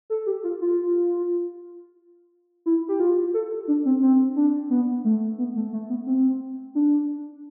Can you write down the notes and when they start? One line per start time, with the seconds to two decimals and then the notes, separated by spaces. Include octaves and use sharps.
0.10 A4
0.26 G4
0.44 F4
0.61 F4
2.66 E4
2.88 G4
3.00 F4
3.34 A4
3.68 D4
3.85 C4
4.02 C4
4.36 D4
4.70 B3
5.04 A3
5.38 B3
5.56 A3
5.73 A3
5.90 B3
6.06 C4
6.75 D4